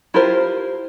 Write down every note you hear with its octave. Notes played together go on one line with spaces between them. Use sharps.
E4 F4 G4 A#4 C5